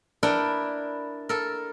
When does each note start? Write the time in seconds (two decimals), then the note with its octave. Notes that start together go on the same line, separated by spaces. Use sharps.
0.23 D4 E4 A#4 B4 F#5 G5
1.29 A4 A#4